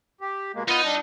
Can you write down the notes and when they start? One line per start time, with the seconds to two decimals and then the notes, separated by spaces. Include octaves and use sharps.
0.21 G4
0.55 B2 G#3 A#3
0.68 B3 D#4 F4 B4 D#5
0.84 G3 D4